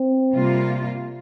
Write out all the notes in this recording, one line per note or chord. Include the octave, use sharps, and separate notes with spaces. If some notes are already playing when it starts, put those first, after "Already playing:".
Already playing: C4
C3 G3 A#3 F4